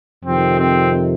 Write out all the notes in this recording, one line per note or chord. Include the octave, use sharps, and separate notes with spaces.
F2 C3 D#3 C4
C4